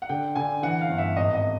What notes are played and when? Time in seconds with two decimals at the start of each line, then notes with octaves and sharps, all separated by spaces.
0.02 F#5
0.09 D3 G5
0.35 D3 G#5
0.63 E3 F#5
0.81 F5
0.89 G1
0.98 E5
1.16 G#1 D#5
1.35 D#5